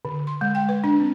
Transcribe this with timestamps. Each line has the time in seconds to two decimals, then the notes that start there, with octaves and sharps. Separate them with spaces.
0.05 D3
0.27 C6
0.41 G#3
0.55 G5
0.69 B4
0.84 D4
1.00 C4